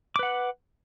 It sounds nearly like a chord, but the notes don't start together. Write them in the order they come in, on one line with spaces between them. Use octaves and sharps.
D6 B4 F#5